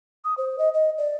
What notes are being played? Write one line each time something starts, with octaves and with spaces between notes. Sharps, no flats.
D#6
C5
D#5
D#5
D5